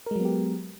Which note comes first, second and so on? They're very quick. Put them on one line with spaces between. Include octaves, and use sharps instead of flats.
A#4 G#3 F#3 B3 G4